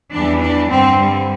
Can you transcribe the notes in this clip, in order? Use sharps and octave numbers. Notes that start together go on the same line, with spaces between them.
E2 E3 G3 D4
D4
G2 D3 G3 C4
G3